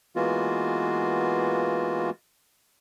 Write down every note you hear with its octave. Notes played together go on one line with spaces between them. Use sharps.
E3 G#3 A#3 B3 F4 F#4